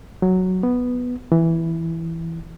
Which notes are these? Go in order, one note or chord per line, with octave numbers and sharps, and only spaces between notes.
F#3
B3
E3